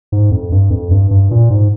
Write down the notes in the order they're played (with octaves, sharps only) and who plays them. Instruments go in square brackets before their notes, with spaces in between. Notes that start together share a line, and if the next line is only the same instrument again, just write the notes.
[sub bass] G#2
F2
G2
F2
G2
G2
A#2
G#2